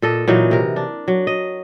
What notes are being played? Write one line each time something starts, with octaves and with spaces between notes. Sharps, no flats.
A#2 A4 D#5
A#2 E3 F#3 D#4
C3 A#4
D4
F#3
D#5